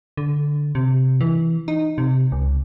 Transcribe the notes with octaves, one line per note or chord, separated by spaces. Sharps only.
D3
C3
E3
D#4
C3
C#2